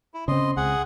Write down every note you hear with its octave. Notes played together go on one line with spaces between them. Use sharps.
E4
C#3 C4 D#5 C6
C#2 G#4 F#5